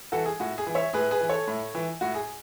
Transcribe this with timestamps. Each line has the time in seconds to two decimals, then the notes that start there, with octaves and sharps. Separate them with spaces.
0.12 E3 F#4 A4
0.26 G#4
0.40 A2 F#4
0.58 G#4
0.67 E3
0.75 C#5 E5
0.93 A2 G#4 B4
1.11 G#4 B4
1.20 E3
1.29 A4 C#5
1.47 A2
1.75 E3
2.01 A2 F#4
2.14 G#4